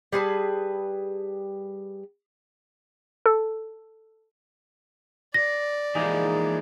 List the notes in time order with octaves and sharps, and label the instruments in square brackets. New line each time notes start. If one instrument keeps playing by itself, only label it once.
[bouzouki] G3 G#4 B4 A5
[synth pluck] A4
[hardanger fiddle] D5 [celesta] A#6
[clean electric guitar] E3 F3 G#3 [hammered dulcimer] A#3 D#4 G#4